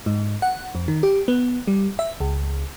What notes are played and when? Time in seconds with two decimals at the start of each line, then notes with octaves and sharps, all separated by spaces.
0.06 G#2
0.42 F#5
0.75 F2
0.88 D#3
1.03 G4
1.28 B3
1.67 G3
1.99 E5
2.20 C#2